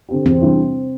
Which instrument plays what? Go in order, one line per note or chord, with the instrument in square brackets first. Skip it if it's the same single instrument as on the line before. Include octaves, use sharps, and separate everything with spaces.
[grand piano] D3 C4 G4
[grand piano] E2 [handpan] C4
[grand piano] E3 G3 D4 C5